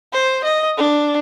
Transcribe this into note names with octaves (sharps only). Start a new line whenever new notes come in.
C5
D#5
D4